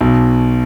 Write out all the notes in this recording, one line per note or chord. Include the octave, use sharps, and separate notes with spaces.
B1 B2